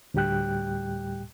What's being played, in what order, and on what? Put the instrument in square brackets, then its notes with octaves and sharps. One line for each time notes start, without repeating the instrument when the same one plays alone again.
[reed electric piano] D2 A2 G3 G4 G5 F#6